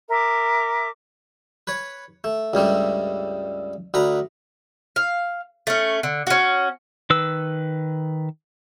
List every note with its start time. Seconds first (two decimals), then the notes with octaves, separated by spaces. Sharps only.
0.09 A#4 E5 D6
1.67 B4 C#5
2.24 A3
2.54 C#2 G2 G3 A3
3.94 D2 B4 A#5
4.96 F5
5.67 A3 C#4
6.03 D3
6.27 C#4 F#4
7.10 D#3 B4 E6